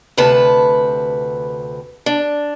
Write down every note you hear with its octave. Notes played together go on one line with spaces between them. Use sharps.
D2 C3 B4 A5
D4